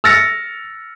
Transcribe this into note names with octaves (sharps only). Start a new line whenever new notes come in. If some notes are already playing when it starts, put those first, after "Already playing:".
E6 F6 A6 A#6 C#7